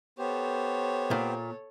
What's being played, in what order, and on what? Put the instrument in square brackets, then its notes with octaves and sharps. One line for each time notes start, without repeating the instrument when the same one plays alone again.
[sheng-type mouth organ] B3 G4 C5 [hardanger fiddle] A4 C#5
[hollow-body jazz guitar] A#2